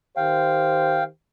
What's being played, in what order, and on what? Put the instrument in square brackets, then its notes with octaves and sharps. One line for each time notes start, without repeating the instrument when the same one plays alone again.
[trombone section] D#3 G4 C5 [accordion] F5 G5